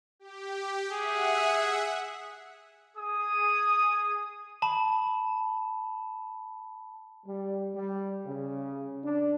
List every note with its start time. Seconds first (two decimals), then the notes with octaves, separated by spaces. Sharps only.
0.19 G4
0.92 G#4 E5 F#5
2.96 G#4 D#6
4.62 A5 B5
7.26 G3
7.74 G3
8.25 C#3
9.03 D4